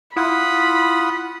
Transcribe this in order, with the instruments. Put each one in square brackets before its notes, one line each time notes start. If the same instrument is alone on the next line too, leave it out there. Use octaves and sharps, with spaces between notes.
[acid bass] E4 [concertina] F4 F#5 D#6 [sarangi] B5